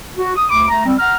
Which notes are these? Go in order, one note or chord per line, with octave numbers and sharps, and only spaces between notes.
F#4
D#6
D2 B5 D6
A3 A#5
G3 C4
F#5 A#5 F6